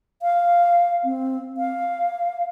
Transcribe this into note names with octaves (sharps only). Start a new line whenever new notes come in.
F5
C4
F5